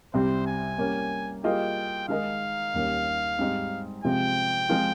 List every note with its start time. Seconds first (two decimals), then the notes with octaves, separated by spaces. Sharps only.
0.13 C2 C3 G3 C4 C5
0.47 G#5
0.78 G3 A#3 C#4
1.44 G3 A#3 F4 G#4 D#5 G5
2.08 D#3 G#3 D#4 A#4 D#5 F5
2.74 D#2 D#3 G3 A#3 C#4
3.39 G#2 G3 C4 D#4
4.04 C3 F3 G#3 C4 G5
4.69 F3 G#3 C4 F4